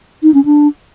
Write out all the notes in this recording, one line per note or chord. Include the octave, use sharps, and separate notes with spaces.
D#4
C#4
D4